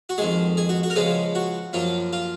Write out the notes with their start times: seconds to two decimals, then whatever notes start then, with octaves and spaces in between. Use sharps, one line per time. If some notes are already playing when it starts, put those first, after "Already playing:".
0.09 F#4
0.18 F2 D#3 G#3 G#4
0.57 G#4
0.69 F#4
0.83 F#4
0.90 A#4
0.96 C#3 F3 G#3 B3 G#4
1.35 F#4
1.73 F#2 F3 A#3 F4
2.13 F4